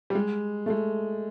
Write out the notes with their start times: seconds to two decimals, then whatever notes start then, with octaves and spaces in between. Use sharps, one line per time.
0.10 G3
0.15 G#3
0.66 A3
0.70 G#3